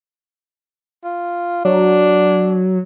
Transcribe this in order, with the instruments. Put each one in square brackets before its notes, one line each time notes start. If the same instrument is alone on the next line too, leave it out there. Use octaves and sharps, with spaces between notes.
[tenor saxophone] F4
[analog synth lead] F#3 [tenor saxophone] D4